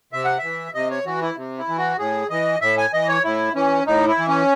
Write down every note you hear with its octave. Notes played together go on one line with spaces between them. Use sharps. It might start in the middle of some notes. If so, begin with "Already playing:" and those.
C3 E5
F#5
E3 E5
C3 D#5
C#5
E3 F#4
E4
C3
E4
E3
F#4
A2 G#4
E3 D#5
A2 E5
G#5
E3 D#5
C#5
A2 E4
E3 C#4
A2 D#4
E4
E3
C#4